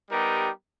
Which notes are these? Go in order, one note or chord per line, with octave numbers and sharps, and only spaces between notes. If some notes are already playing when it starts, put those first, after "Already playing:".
G3 B3 D#4 G4 A#4